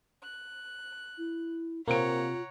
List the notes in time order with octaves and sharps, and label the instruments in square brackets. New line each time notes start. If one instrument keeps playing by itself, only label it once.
[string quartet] F#6
[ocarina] E4
[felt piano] C3 D7 [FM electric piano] A#3 C4 [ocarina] F4 [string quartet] C#5 F#5 A#5